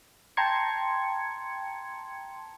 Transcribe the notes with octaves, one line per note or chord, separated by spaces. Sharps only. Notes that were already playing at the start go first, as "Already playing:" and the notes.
G5 A5 A#5 C6 G#6 C#7